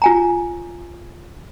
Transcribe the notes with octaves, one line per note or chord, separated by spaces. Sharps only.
F4 G#5 A#5